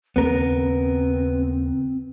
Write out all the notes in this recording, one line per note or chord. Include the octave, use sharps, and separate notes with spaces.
D#2 C#3 B3 C4 A#4